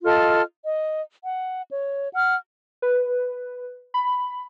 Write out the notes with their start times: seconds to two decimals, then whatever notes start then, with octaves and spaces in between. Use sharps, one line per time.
0.04 F4 A4 D#5 F6
0.64 D#5
1.23 F#5
1.70 C#5
2.14 F#5 F6
2.82 B4
3.94 B5